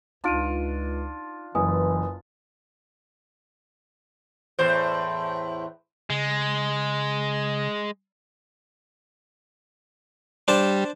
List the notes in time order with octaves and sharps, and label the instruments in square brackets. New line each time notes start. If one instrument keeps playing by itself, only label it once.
[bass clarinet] C#2 [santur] D4 F4 [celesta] D#4 D7 D#7
[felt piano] F#1 [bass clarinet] E3 [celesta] B4 G#5 D#6
[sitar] E2 A2 C5
[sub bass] C#3 [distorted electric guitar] G#3
[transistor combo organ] G3 [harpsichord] D4 C5 A5